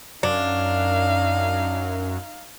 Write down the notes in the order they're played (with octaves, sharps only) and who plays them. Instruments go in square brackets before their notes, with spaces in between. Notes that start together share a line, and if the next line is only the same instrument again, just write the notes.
[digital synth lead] F#2 [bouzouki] D4 [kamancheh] D#4 F5